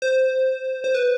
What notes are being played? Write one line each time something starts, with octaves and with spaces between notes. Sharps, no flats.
C5
C5
B4